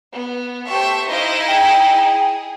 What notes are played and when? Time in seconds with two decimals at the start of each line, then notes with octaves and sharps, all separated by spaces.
0.14 B3
0.67 A3 G4 C5 E5 C#6
1.08 D#4 E4 C5 D#5 F5
1.47 G#4 G5